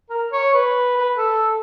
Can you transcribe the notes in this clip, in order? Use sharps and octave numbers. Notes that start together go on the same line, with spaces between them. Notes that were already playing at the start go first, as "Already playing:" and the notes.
A#4
C#5
B4
B4
A4